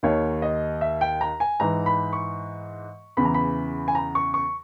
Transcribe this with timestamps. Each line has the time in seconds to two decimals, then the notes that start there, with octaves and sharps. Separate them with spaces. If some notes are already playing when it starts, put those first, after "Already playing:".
0.03 D#2 D#3 C#5
0.42 D#5
0.81 E5
1.01 G5
1.21 A#5
1.40 G#5
1.60 G#2 E3 A#5
1.86 B5
2.13 C#6
3.17 E2 C#3 E3 B5
3.25 A#5
3.34 B5
3.88 G#5
3.95 A#5
4.15 C#6
4.34 C#6